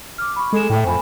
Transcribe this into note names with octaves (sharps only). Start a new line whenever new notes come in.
D6 F6
B5 C#6
G#3 A4 E7
A2 G5
F2 C5 G#5 B5